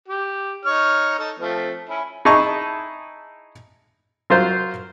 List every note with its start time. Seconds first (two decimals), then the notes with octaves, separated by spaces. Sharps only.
0.08 G4
0.65 D#4 C#5 F6
1.19 D#4 A4 A5
1.39 F3 A3 C4
1.89 C#4 E4
2.25 D#4 E4 G#4 A5 C#6
4.30 F#3 F4 A#4 C5